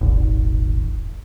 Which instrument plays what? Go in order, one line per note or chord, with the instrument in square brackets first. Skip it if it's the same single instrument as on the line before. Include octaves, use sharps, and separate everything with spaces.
[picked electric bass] D#1 G#1